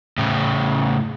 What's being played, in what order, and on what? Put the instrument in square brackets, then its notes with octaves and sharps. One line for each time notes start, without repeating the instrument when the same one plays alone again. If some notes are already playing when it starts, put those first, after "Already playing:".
[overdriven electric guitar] A2 C#3